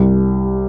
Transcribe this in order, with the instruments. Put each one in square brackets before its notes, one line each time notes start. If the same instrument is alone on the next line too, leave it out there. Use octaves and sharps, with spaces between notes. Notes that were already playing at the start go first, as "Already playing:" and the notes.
Already playing: [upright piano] C2 G4